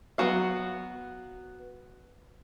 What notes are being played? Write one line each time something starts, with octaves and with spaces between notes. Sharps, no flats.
F#3 B3 D4 F#4 F5